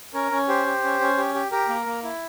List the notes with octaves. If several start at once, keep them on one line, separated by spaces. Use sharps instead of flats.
C#4 A#4
C#4
G4 C5
G4
C#4
C#4
G4
G4
G4 A#4
A#3
A#3
E4